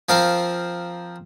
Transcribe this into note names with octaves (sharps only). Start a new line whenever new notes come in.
F3 C4 A#4 F5